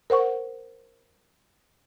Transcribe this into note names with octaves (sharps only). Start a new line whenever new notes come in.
A#4 C5 F#5 C#6